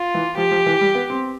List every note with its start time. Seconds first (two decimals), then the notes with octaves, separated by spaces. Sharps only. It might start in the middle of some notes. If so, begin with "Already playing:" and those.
Already playing: F4
0.14 E3
0.37 F3 G4
0.51 F3
0.66 E3
0.81 G3
0.95 B3
1.10 C4